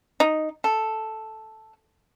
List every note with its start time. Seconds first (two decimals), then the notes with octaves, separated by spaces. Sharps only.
0.20 D#4
0.64 A4